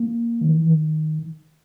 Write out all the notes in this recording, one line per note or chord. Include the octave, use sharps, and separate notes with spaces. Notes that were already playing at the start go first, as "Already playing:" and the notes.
Already playing: A#3
D#3
E3
D#3